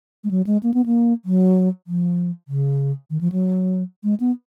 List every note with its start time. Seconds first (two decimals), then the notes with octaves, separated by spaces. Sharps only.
0.24 G#3
0.31 F#3
0.47 G#3
0.63 A#3
0.74 B3
0.86 A#3
1.25 F#3
1.87 F3
2.48 C#3
3.10 D#3
3.21 F3
3.32 F#3
4.04 G#3
4.20 B3